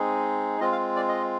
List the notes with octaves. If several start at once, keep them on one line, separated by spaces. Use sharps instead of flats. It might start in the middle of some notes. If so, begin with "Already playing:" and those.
Already playing: G#3 C4 D#4 G#4
G#3 C4 F4 D#5
F5
D5
D#5